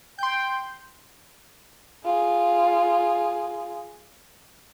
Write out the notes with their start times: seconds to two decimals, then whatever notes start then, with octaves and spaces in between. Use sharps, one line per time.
0.19 G5 C6 G6
2.05 F4 G#4